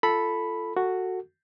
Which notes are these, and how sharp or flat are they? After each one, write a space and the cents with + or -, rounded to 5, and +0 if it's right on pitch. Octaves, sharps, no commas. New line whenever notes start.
F4 -15 A4 +0 B5 +0
F#4 +0 A4 +20